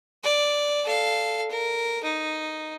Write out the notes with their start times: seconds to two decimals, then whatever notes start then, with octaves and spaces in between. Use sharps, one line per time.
0.24 D5
0.85 A4 F5
1.50 A#4
2.03 D#4